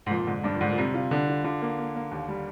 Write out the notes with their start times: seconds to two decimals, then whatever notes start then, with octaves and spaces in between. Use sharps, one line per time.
0.06 G#2
0.10 F2 A#2
0.27 G#2 D3
0.44 G2 D4
0.54 A#2
0.61 G#2 D3
0.71 A#2
0.78 C3 G3
0.94 F4
1.11 D3 D4
1.28 F4
1.44 D3 F4
1.62 A#3
1.78 A#3
1.95 A#3
2.11 D#2
2.28 G3